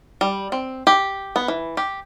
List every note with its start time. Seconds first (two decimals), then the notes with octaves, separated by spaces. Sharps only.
0.21 G3
0.52 C4
0.87 G4
1.36 B3
1.48 E3
1.77 G4